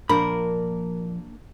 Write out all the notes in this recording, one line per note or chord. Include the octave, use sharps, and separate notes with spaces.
A#2 F3 A#3 D4 A#4 B5